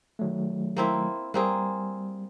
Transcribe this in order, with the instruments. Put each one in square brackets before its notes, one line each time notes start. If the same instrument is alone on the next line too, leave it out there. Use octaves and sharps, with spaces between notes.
[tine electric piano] D#3 F#3 A3
[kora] A#3 C4 E4
[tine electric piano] G3 [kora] A#3 C4 G#4